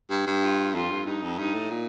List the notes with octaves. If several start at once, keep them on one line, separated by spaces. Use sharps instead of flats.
G2
G2
F4
F2 F4
G2
G2 D#4
F2
G2 D#4
A2
A#2